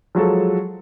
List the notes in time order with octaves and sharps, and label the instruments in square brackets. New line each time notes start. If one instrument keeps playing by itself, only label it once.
[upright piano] F3 F#3 G#3 A4